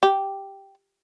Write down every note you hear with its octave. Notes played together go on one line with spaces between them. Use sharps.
G4